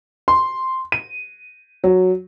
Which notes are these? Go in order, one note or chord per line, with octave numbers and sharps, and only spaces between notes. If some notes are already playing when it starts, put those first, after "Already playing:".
C6
D#7
F#3